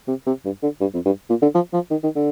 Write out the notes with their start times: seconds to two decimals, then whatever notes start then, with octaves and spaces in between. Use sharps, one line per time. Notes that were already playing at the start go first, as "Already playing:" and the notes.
0.08 C3
0.27 C3
0.45 G2
0.63 D3
0.81 G2
0.94 F2
1.06 G2
1.30 A#2
1.42 D3
1.55 F3
1.73 F3
1.91 D#3
2.03 D#3
2.16 D3